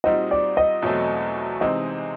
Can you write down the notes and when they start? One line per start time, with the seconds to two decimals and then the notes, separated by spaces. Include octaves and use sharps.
0.04 A#2 G3 C4 D#4 F#4 D#5
0.31 D5
0.57 D#5
0.82 E2 B2 F#3 A3 C4
1.61 C3 E3 G#3 C4 D#4 D#5